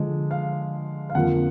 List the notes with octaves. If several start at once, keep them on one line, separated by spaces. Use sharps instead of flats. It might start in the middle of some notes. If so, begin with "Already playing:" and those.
Already playing: D3 F3 G#3
F5
F5
F2 D3 F3 A#3 F#5